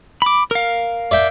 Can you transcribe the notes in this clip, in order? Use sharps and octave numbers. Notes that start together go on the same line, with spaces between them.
B5 D6
A#4 F5
D5 E5 G5